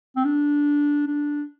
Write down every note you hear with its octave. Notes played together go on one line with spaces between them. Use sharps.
C4
D4
D4